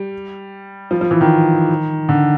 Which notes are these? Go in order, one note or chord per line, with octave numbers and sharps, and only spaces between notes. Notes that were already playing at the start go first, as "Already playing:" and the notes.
Already playing: G3
F3
F3
E3
D#3
D3